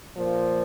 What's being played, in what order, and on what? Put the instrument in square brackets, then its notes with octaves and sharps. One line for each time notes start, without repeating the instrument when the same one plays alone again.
[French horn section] A#2 F3